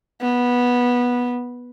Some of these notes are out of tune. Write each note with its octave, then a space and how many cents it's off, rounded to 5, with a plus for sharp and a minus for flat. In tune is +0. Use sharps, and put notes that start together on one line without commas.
B3 -15